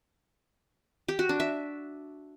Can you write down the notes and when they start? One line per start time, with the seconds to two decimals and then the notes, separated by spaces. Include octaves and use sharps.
1.08 G4
1.19 F#4
1.29 D4
1.40 E5